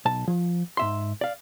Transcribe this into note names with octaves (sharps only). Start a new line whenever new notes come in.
B1 A5
F3
G#2 E5 C6
D5 F5